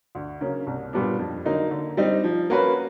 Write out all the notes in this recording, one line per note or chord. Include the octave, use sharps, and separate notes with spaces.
D2
C#3 F#3 A#3
C2
A#2 G3 B3 D4
F2
D3 F#3 A#3 D#4
D3
G3 C4 D#4
F3
A#3 C#4 F#4 B4